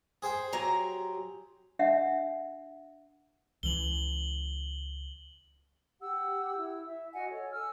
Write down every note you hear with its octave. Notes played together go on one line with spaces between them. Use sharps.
G#4 C5 G5
F#3 G4 A#5
D4 E5 F#5
C#2 E3 F#7 G7
G4 F#5 E6
E4 E6
E5
F#4 D#5 F#5 G#5
A4 C#5
G#5 E6 F6